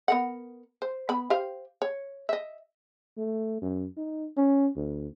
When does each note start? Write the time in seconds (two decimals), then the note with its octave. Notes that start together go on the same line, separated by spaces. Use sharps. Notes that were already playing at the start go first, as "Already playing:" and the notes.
0.08 B3 A#4 F#5
0.82 C5
1.09 B3 B5
1.30 G4 C5 F5
1.82 C#5
2.29 D#5 E5
3.17 A3
3.62 F#2
3.97 D#4
4.37 C#4
4.76 D2